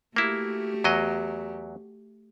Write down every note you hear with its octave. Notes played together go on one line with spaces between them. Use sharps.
A3 A#3 E4 F#4 G4
E2 F#3 D#5